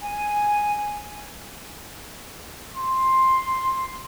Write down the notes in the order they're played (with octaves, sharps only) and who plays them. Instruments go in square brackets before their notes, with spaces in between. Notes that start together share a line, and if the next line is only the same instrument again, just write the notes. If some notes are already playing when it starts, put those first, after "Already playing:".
[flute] G#5
[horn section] C6